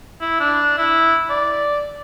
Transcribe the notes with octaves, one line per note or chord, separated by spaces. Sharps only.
E4
D4
E4
D5